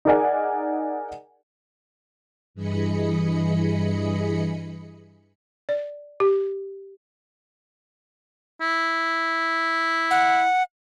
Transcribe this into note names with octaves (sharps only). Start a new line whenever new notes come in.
D#4 G#4 A#4 D5 F#5 G#5
G2 E3 G#4 D#5 B5 C#7
D5
G4
E4
F#5